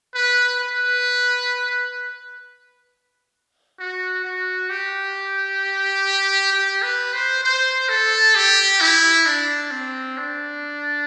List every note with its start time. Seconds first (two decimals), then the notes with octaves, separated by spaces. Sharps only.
0.14 B4
0.60 B4
3.79 F#4
4.24 F#4
4.70 G4
6.52 G4
6.82 B4
7.14 C5
7.44 C5
7.89 A4
8.35 G4
8.81 E4
9.26 D4
9.71 C4
10.17 D4